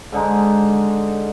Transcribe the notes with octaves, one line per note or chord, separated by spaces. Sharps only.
G#2 D3 G#3 D#4